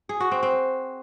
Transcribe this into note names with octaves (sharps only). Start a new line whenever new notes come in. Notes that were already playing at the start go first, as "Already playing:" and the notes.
G#4
F#4
C4
C4